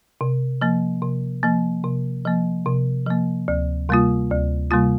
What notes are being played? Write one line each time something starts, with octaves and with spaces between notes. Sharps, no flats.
C3
F3 A#3
C3
F3 A#3
C3
F3 A#3
C3
F3 A#3
D2
C3 G3 A#3 F4
D2
C3 G3 A#3 F4